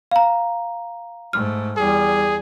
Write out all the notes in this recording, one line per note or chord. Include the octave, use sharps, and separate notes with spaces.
F5 A#5
G#2 A3 F6
E2 G3 G#4